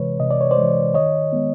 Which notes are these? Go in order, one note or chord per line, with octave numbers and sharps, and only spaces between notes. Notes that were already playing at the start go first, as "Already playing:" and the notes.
Already playing: C3 E3 G#3 B4 C#5
C3 D#5
D5
C#5
C5 D5
E3 G#3
D#3 C#5 D#5
G#3 B3